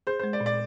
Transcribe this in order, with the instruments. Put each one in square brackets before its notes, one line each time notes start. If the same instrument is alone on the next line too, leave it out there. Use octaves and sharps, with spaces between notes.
[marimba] G#4 [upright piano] C5
[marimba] G#3 [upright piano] C5
[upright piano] D5
[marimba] A#2
[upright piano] D5